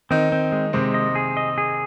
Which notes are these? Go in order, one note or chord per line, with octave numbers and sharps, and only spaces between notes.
D#3 C4 D#4
C4
G#3
C3 G#3 C4
D#5
G#4
D#5
G#4